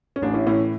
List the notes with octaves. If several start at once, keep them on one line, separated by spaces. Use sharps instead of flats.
C#4
A1 D4
C#4 E4
A2 E3 C#4 E4